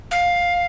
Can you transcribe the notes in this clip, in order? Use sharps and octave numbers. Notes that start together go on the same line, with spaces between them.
F5